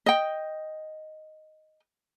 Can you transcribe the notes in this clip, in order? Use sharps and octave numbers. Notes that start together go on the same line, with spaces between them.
D#5 G5